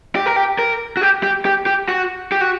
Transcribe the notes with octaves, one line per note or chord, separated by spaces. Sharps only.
G4
A#4
G4
A#4
F#4
G4
G4
G4
G4
F#4
G4
F#4